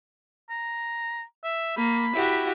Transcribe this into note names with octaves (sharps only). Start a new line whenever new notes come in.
A#5
E5
A#3 B5
E4 F#4 G4